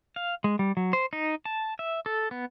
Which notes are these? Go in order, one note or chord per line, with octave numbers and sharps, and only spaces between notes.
F5
G#3
G3
F#3
C5
D#4
A5
E5
A4
B3